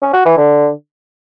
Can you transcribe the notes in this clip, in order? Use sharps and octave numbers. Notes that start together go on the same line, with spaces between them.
C#4
F#4
E3
D3